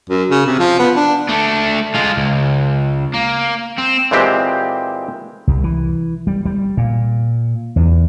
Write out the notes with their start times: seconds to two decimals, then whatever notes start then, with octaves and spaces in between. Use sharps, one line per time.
0.10 F#2
0.31 C#3
0.47 C3
0.59 F3
0.79 B3
0.97 D4
1.29 A3 D4
1.94 G#3 F4
2.17 C#2
3.14 A#3
3.78 C4
4.11 A#2 E3 G#3 C4 G4
5.47 C2
5.64 E3
6.27 G3
6.45 G3
6.77 A#2
7.76 E2